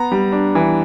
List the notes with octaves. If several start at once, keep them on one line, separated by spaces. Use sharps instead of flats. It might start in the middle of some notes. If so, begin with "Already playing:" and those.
Already playing: B3 A#5
G3
D4
E3